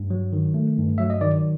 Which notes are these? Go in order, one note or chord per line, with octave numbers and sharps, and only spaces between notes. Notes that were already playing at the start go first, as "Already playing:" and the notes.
Already playing: G2
F#3
D#3
A3
G2
F#3 E5
D#5
D#3 D5